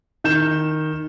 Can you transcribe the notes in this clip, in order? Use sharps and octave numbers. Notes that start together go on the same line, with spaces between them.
D#3 G6 E7